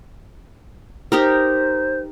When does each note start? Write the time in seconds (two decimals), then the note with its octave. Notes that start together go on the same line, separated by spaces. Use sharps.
1.12 D#4 G4 A#4 C5